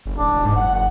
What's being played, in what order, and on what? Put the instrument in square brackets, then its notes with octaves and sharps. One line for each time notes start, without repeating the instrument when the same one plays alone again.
[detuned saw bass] F#1
[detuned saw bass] D1 [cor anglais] D4
[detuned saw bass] E1
G#2
[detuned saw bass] F#1 [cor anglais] F#5
[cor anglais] F#5